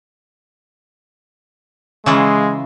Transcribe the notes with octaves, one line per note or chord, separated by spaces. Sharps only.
C#3 E3 G#3 F4